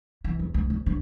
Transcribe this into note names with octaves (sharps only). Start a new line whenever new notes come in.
E3
E2
D2
D2
D3